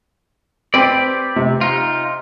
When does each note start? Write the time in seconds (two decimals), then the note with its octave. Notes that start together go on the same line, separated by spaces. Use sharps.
0.74 C4 G4 B4 D5
1.36 C3
1.61 D#4 F4